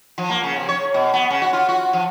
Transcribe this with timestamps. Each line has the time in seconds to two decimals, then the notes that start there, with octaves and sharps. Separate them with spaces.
0.18 F3
0.30 A#3
0.43 C#3
0.56 C3
0.69 C#5
0.94 B2
1.14 B3
1.30 C#3
1.42 F#4
1.53 F4
1.69 F#4
1.93 F3